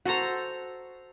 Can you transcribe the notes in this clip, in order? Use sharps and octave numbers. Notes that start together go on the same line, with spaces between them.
F#4 A4 C5 A#5